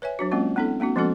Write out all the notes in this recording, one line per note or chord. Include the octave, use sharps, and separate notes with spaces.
B4 C#5 E5 G#5
F#3 D4 F#4
G#3 A#3 C4 C#4 F4
B3 C4 D4 E4 A4
A#3 C4 D4 F#4
F3 G#3 B3 C#4 F#4 A4